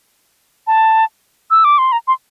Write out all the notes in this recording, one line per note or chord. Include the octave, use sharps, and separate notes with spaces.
A5
E6
D6
C6
A#5
C6